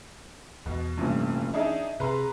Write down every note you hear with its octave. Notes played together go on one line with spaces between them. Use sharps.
E2 B2
F1 G2 A#2 E3 C#4
D4 D#4 G#4 E5
C3 G#4 B4 A#5 C6